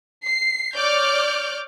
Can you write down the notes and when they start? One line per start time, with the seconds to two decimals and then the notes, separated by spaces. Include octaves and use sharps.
0.24 C7
0.76 C#5 D5 D6 F6 G6